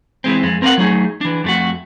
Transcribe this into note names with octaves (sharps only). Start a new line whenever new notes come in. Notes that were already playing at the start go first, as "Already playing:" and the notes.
E3 G#3 C4
F2 G#3
C4 A#4 D5 F5 F#5
F#3 A3 D#4 G#4
E3 D4
F2 A3 F#4